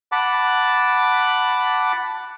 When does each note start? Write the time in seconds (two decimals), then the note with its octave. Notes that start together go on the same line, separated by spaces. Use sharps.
0.12 F#5 A5 B5 D6